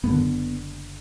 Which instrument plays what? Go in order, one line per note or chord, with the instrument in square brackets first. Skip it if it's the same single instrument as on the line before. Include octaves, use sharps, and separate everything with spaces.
[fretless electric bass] F#1 F#2 D3 B3